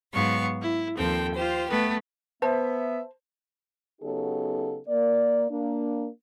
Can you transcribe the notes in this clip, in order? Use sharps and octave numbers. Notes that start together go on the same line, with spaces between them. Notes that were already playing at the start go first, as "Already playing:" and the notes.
G#2 F#3 B3 F5 C#6
E4
D#2 F3 C4 A4 G5
F4 G4 C5
A3 B3 B4
B3 C5 E5 A5
C#3 F#3 B3 D#4 G4 A4
A#3 D5
A#3 D4